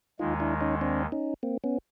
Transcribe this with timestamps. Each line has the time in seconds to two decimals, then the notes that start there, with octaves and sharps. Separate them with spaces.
0.19 D#2 D#3 G#3 D#4 F4
0.40 D4 E4
0.61 C#4 D#4
0.81 C4 D4
1.12 C#4 D#4
1.43 A#3 C4
1.64 B3 C#4